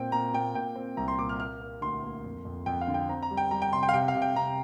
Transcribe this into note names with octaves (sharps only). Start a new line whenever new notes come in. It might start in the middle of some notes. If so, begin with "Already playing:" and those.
Already playing: A#2 C4 G5
A#2 A#5
A#2 G5
A#2 G5
C4
C2 A#5
C6
A#2 D6
F6
A#3 F6
A#3
D2 C6
A#3
F2
F2
F2 G5
F5
D3
G5
C4 A#5
A#5
G3
G5
G3 A#5
G5
C3 C6
G5
F5
C3 G5
F5
C3
G5
C3 A#5